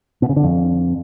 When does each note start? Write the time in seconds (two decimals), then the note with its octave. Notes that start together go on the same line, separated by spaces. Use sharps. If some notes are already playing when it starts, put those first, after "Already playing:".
0.22 B2
0.29 C#3
0.36 D3
0.44 F2